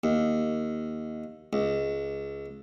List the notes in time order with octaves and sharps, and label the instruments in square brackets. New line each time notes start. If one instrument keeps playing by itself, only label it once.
[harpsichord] D#2
C#2